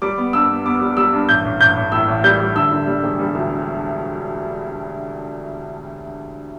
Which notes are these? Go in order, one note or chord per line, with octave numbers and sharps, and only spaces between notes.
G3 D6
B3
G2 E6
B3
B3 D6
G3
G3 E6
G2
A1 G6
A1
A1 G6
A1
A2 E6
A1
G3 G6
G3
D3 E6
D3
G3
E1
G3
D2